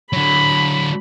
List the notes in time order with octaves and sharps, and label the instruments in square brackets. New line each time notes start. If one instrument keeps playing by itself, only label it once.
[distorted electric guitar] D3 F#3 [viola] B5